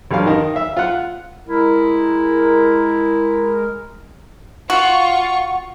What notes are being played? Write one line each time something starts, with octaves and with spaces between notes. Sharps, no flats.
B1 G2 G4 F5
D#3 D#5
E5 F5
F4 F#5
G#3 E4 A#4
F4 F#4 F#5 C#6